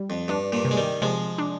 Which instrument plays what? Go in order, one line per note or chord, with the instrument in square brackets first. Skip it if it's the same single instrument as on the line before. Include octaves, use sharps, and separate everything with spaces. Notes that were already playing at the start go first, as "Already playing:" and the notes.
Already playing: [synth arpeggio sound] G3
[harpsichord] F2
[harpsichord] G2 [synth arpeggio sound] D4
[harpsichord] G2 A#2
[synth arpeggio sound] C3
[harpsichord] G#3
D#3 G3
[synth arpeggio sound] C3 [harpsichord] F3 G#3
[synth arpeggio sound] D4